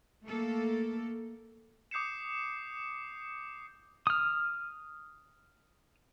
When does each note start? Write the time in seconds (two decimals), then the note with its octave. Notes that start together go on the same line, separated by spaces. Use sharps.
0.24 A3 A#3 A4
1.91 D6 D#6 G6 C7 C#7 E7
4.07 D#6 F6